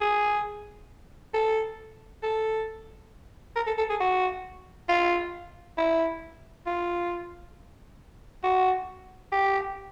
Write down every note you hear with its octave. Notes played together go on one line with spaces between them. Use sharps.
G#4
A4
A4
A#4
A4
A4
G#4
F#4
F4
E4
F4
F#4
G4